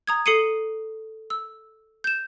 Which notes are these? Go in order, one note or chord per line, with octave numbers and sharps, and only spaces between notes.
A#5 D#6 G#6
A4 D#6 C7 C#7 D#7
E6
G6 E7